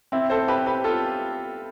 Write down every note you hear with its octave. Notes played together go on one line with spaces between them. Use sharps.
C4 E4
A4 C5
G4 B4
G4 B4
F4 A4